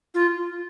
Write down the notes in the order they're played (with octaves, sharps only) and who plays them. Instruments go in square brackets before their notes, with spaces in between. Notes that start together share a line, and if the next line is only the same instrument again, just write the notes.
[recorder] F4